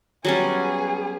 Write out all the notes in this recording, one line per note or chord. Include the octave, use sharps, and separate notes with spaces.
F#3 G3 B3 C#4 G#4